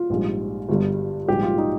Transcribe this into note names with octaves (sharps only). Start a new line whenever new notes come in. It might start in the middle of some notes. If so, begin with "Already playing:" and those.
Already playing: F4
A#1 G#2 G3
G1 G2 G3
A#1 G#2 G3 G4
F4
D#4